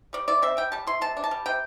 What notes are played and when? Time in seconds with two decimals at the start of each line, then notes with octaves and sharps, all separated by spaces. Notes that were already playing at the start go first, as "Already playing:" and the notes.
0.13 G3 D5
0.28 E4 D5
0.42 C4 E5
0.57 G3 G5
0.72 G3 A5
0.87 E4 C6
1.01 C3 A5
1.17 D4
1.24 A5
1.31 G3
1.46 C3 G5